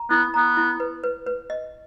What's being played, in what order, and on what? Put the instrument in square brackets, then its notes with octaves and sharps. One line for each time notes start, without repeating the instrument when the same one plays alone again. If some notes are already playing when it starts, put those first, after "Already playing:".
Already playing: [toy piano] A#5
[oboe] B3 [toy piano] E4
[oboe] B3 [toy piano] A#5
[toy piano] E4
B4
B4
B4
D#5